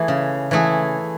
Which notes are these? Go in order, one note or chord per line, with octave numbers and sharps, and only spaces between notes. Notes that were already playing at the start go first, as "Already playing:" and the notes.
Already playing: E3 A3 E4 G#4
C#3
E3 A3 E4 G#4